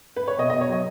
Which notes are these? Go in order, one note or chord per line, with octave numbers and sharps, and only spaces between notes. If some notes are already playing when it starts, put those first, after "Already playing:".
B4
C#5
B2 D#5
D#5
B2
C#5
F#3 D#5